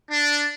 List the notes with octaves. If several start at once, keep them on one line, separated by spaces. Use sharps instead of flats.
D4